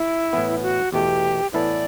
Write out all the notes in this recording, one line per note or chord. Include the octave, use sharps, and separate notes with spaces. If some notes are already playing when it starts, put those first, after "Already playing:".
Already playing: E4
A2 E3 B3
F#4
E2 B2 A3 G4
A2 E3 B3 E4 A4 D5